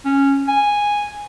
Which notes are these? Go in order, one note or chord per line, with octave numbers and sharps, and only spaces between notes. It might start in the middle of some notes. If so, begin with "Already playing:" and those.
C#4
G#5